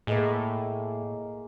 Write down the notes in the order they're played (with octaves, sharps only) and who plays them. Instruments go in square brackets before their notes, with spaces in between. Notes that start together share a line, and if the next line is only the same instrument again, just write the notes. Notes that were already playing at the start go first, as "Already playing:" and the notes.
[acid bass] A2 [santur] G#3 A#3